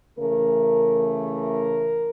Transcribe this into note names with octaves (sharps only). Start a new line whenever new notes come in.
C#3 E3 A3 A#4
A#4